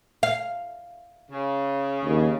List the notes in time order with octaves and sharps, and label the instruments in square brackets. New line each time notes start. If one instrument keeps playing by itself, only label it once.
[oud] F5
[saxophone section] C#3
[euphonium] D#2